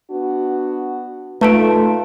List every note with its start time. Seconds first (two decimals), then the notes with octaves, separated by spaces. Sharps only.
0.11 B3 D4 F#4
1.41 A#2 A3 D#4 F4 B4 A5 D7